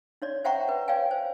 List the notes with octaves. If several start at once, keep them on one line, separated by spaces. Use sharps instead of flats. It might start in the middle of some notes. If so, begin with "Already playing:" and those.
D#4 C#5 D5
C5 E5 F#5 G5 A#5 C#6
B4
C#5 D5 F5 G5 G#5
C5